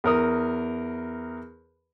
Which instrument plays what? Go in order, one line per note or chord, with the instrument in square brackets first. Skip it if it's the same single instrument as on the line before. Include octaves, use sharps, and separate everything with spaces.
[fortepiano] E2 A#4 D#6